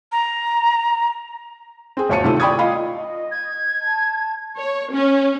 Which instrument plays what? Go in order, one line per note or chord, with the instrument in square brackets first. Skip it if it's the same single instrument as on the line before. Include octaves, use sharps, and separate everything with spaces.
[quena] A#5
[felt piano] C4 G#4
G1 D2 C#5 A5 C#7 D#7
C3 D#3 A3 E4 F4 A4
D5 G5 B5 C#6 D#6 G#6
F4 D#5 F5 B5
[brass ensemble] D#5
[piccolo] G#6
[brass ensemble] A5
[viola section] C#5
C#4